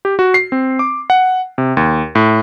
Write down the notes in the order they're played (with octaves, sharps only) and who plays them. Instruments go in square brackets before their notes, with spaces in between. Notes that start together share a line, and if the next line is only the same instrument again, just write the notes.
[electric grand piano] G4
F#4
C7
C4
D6
F#5
C3
D#2
A2